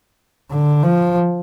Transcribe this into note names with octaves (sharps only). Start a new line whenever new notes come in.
D3
F3